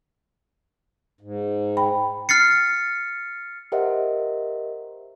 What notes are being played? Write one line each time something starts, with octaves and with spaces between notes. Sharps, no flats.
G#2
G5 B5
F6 A6 C7 C#7
G4 A#4 C5 D#5 E5 F#5